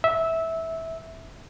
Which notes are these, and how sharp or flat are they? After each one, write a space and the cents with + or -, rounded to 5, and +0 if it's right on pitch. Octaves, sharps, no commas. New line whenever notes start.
E5 -15